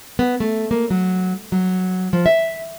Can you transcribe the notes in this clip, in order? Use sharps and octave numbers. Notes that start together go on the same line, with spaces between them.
B3
A3
A#3
F#3
F#3
F3
E5